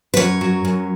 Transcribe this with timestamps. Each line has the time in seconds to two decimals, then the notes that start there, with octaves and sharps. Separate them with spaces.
0.14 B4
0.17 F#2 C#5
0.41 F#3
0.65 F#2